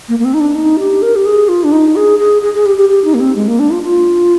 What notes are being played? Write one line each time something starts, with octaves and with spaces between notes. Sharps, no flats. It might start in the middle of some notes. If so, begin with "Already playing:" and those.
A#3
A#3
C4
D#4
D4
D#4
G4
A#4
G4
G#4
F4
D4
D#4
G#4
G#4
G#4
G#4
G4
G4
G4
D#4
A#3
C4
G#3
A#3
D4
F4
F4